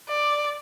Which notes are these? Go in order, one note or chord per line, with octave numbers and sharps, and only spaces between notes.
D5